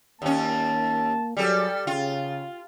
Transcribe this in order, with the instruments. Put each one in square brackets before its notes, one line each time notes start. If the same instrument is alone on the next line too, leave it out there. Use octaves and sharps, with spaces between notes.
[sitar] D#2 C#4 [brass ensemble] A#3 A5
[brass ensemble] F#3 G#4 [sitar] G3 A4
[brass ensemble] C#3 [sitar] F4